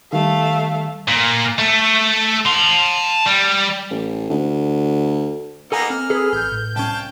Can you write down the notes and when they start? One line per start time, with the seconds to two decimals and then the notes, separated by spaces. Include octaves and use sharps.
0.13 D#3 G3 A3 F5
1.08 A#2
1.58 A3
2.45 A5 C6
3.26 G3
3.91 A1
4.30 D2
5.72 A#3 B3 D#4 A4 G#5 A#5
5.90 C4 F6
6.10 G#4 A4 B4
6.33 A1 G6
6.52 A2
6.76 C2 C#4 F5 G5 A5